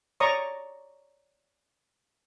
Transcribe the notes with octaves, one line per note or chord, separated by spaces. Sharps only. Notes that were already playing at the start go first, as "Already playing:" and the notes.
C#5 D5 A#5 C#6 D#6